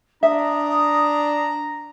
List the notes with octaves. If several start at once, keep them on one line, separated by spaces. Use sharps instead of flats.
D4 E5 A#5 D#6